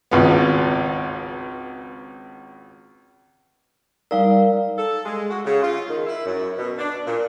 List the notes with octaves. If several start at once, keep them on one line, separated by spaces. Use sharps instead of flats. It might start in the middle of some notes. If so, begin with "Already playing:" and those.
G#1 C#2 B3
G3 D#4 A#4 D5 F5
D#4
A4
G#3
F#4
C#3
F4
D#3
E4
F#2
B2
D4
A#2